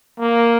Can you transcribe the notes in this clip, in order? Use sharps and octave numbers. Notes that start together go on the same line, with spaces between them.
A#3